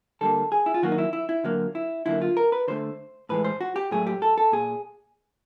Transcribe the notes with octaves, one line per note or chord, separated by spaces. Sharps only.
D3 G3 A#3 A4
G#4
E4
F4
D#3 F#3 A#3 F#4
D#4
E4
E4
E4
D3 F#3 A#3
E4
D3 F#3 A#3 E4
F4
A#4
B4
D3 F#3 A3 C5
A2 E3 G#3 B4
C5
F#4
G4
A2 F#3 A3 G#4
G4
A4
A4
A#2 G#4